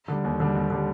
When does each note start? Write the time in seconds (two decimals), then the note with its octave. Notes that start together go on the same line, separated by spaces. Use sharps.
0.08 D3 G3
0.24 D#2
0.40 D3 G3
0.55 D#2
0.70 D3 G3